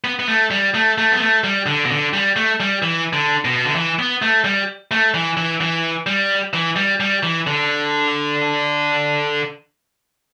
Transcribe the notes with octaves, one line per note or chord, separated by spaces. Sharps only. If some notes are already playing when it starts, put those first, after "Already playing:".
B3
B3
A3
G3
A3
A3
B3
A3
G3
D3
B2
D3
G3
A3
G3
E3
D3
B2
D3
E3
B3
A3
G3
A3
E3
E3
E3
G3
E3
G3
G3
E3
D3